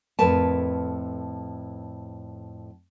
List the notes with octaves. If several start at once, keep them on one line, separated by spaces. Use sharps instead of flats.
F2 A2 A#4 B4 A5